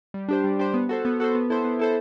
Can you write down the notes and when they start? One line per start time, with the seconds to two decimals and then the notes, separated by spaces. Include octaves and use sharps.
0.14 G3
0.29 D4 G4 C5
0.44 G3
0.59 D4 G4 C5
0.74 B3
0.89 F#4 A4 C5
1.05 B3
1.20 F#4 A4 C5
1.35 B3
1.50 E4 A4 C5
1.64 B3
1.79 E4 A4 C5